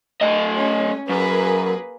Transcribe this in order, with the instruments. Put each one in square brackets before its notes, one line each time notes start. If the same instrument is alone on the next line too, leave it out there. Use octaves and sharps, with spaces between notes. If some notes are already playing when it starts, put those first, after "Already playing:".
[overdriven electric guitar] A3 D#5
[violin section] C#4
[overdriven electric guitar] F#2 [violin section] A#3 G#4 B4